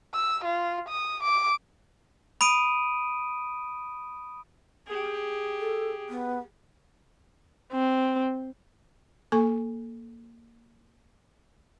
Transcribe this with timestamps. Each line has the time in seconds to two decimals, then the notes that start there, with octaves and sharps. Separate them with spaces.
0.15 E6
0.45 F4
0.89 D#6
1.23 D6
2.41 B5 D#6 D7 D#7
4.87 G4 G#4
5.59 A4
6.09 B3
7.73 C4
9.32 A#3 A4 G#5 C#6